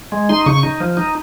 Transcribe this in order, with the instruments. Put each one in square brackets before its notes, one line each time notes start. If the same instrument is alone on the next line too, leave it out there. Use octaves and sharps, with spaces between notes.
[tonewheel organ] G#3
D#4 C6
C#3 C#6
D#4
F3
D#4